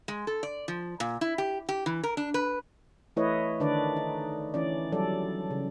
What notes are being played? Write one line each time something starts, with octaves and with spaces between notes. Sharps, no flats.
G#3
A4
D5
F3
A#2
E4
G4
G4
E3
A#4
D4
B4
E3 A3 E4 B4 C#5 D#5
D3 D#3 D4 B4 D5
D#4
E3 C#4 D5
F#3 G3 A4 D5
C#3